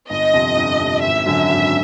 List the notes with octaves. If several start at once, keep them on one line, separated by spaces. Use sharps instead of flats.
G1 D#5
F2 C3
G1
F2 C3
G#1 E5
F#2 D3 F#3
G#1